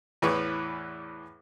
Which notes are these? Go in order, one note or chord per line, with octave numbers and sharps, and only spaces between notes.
E2 A2 E3 B4 C#6